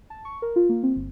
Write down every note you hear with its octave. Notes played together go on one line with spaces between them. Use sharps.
A5
C#6
A#4
F4
A#3
C4
G1